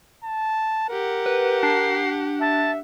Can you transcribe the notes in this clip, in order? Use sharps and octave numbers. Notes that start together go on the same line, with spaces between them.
A5
G4 A#4 F#5
B4
D4 C7
E5 A5